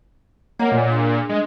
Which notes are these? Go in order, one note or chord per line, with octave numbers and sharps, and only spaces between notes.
A#3 C#5 D#5 F#5
A#2
D4 G#4 C6
G#3